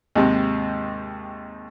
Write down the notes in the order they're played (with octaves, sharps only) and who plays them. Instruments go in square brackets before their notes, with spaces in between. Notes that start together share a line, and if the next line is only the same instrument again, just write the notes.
[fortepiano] D#2 G#2 C3